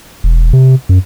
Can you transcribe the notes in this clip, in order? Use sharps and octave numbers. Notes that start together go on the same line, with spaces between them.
E1
C3
F#2